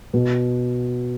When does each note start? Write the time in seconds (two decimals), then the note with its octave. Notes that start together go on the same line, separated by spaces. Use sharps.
0.14 B2